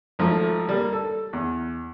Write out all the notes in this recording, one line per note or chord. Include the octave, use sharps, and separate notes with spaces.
G#1 F3 A3
G3 A#3
A4
E2